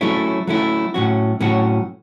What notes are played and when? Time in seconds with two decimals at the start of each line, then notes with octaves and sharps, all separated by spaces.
0.01 F#3 A3 C#4 E4
0.47 F#3 A3 C#4 E4
0.94 A2 F#3 C#4 F#4
1.40 A2 F#3 C#4 F#4